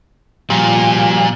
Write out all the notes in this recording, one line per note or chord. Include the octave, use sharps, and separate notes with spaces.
A#2 F3 G3